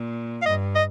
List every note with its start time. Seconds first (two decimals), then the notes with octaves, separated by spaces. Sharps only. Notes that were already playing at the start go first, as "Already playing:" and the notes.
Already playing: A#2
0.42 F5
0.46 G2 D#5
0.75 D#5